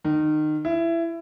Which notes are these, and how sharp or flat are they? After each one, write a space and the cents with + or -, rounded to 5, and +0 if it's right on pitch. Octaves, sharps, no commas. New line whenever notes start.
D#3 -25
E4 +20